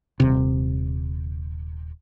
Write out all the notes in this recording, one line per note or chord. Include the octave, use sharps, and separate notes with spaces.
D#1 C3